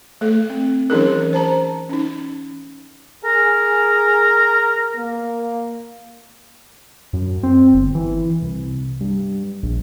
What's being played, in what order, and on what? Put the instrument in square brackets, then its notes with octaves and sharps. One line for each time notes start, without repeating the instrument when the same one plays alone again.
[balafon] A3 A4
C4
E3 F#3 C#4 D#4 G#4 A#4
C5 A5 A#5
C#4 D#4
[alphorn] G#4 [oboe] A#4
[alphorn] A#3
[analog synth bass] F#2
C4
G1
E3
C2
G2
A#1